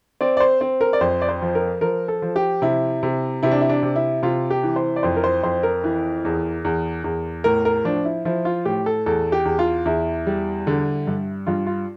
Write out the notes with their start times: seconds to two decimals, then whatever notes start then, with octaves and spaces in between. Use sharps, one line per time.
0.21 C4 D5
0.37 D5
0.40 C5
0.61 C4
0.81 A#4
0.93 D5
1.01 F2 C5
1.22 D5
1.29 C5
1.42 F3
1.55 A#4
1.81 F3 A#4
2.08 A4
2.22 F3
2.36 G4
2.62 C3 E4
3.03 C3
3.43 C3 E4
3.51 D4
3.61 E4
3.69 D4
3.82 C3
3.96 E4
4.22 C3 F4
4.50 G4
4.63 E3
4.76 C5
4.96 D5
5.03 F2 C5
5.16 A#4
5.24 C5
5.43 F2 C5
5.63 A#4
5.84 E3
6.25 E2
6.65 E2
7.04 E2
7.44 A2 A#4
7.65 A#4
7.84 F3 D4
8.05 E4
8.25 F3 E4
8.45 F4
8.65 A2 G4
8.86 A4
9.06 E2 A4
9.32 G4
9.45 E2
9.59 F4
9.86 E2 E4
10.27 G3
10.67 D3
11.07 G2
11.47 G2 F4
11.67 F4